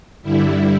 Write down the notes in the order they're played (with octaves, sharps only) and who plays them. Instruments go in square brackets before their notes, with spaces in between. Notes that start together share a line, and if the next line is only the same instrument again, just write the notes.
[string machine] G2 D3 G3 E4